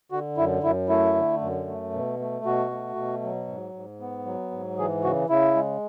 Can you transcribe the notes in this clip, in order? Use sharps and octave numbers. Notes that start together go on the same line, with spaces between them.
D3 F#4
F#2 E4
F#2 E4
A3 E4
D3
F#2
A3
B2
A3
B2 F#4
A3
B2
F#3
G#2
G#2
B3
F#3
G#2
E3 G#4
C#3 F#4
C#3 E4
G#3